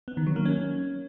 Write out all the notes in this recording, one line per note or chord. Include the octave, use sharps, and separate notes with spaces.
B3
D#3
F#3
A#3
C#4